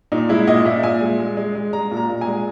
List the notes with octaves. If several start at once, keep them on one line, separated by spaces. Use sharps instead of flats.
A#2 D#4
G#3 E4
A#2 D#5
A#2 E5
A#2 G#5
G#3
G#3
G#3
G#3
G#3 A#5
A#2
A#5
A#2
G#5
G#3